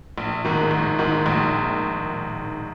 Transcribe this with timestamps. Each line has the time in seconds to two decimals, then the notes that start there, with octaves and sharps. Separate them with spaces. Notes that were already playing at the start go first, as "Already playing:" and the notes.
0.18 A#1
0.44 G#2 D#3
0.71 A#1
0.99 G#2 D#3
1.26 A#1